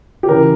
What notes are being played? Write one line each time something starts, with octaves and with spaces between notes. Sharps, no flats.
G4
C#3 E3 A#4